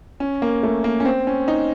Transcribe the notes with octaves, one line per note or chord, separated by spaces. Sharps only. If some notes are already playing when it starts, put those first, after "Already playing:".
C#4
A#3
A3
A#3
C#4
C4
C#4
D#4